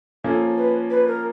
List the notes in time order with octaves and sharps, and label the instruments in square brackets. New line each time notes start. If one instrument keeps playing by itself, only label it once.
[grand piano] F3 A#3 C#4 [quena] A4
[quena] B4
B4
A#4